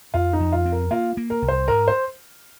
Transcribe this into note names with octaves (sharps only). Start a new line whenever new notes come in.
F2 F4
D#4
F2
F4
C4
A#4
A#3 F4
A#3
A#4
C2
C5
G#2 A#4
C5